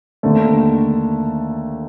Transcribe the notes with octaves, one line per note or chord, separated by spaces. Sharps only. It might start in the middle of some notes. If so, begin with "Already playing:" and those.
D#2 D3 A3